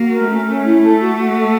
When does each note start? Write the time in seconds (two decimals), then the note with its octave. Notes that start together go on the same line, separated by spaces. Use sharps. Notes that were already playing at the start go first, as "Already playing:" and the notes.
Already playing: A#3 F#4
0.11 A#4
0.29 A3 C#4
0.47 C#4
0.63 E4
0.82 A4
1.00 F#4
1.16 F#4
1.34 A4